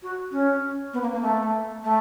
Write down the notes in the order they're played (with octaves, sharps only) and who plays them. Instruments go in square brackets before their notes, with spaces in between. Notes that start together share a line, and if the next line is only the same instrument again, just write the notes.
[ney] F#4
C#4
B3
A#3
A#3
A3
A3